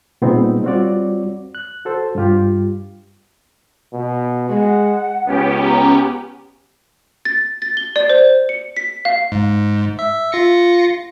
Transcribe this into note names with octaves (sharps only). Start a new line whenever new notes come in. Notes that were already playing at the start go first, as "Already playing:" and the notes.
A#2 G3 B3 C4 D#4 G#4
G3 C4 F4 F#4 C#5 D5
F#6
F#4 A4 C5
G2 G3 F4 G4
B2
G#3 F#5
C#2 B3 C#4 G4
A#5
A6
A6
G7
D5
C5
C#7
B6
F5
G#2
E5
F4 A#6 C#7